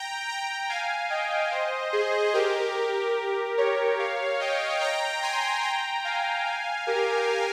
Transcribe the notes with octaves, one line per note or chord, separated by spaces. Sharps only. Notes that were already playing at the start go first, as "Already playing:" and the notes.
Already playing: G5 A#5
G5 A#5
F5 G#5
D#5 G5
C5 D#5
G#4 C5
G4 A#4
A#4 C#5
C#5 F5
D#5 G5
G5 A#5
G#5 C6
G5 A#5
F5 G#5
F5 G#5
G4 A#4